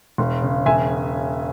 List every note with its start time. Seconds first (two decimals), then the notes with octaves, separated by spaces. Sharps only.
0.18 E1
0.42 C#3
0.66 E1 E5 G#5